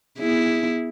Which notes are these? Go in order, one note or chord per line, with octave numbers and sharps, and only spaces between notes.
B3 E4 G#4